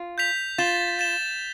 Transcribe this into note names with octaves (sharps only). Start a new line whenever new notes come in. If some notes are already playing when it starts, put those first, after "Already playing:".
Already playing: F4
G6 B6 F7
F4 A6 E7 G7
A6 E7 G7